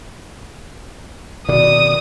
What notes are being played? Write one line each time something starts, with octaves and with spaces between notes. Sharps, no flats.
B2 D#3 D5 D#6